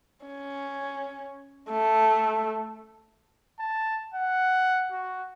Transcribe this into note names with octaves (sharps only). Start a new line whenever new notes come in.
C#4
A3
A5
F#5
F#4